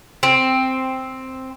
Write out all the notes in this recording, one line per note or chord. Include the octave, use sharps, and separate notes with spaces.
C4